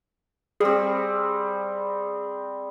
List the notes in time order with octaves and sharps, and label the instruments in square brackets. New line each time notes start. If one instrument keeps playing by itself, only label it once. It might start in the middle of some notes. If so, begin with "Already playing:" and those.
[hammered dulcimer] G3 C4 [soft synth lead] G#4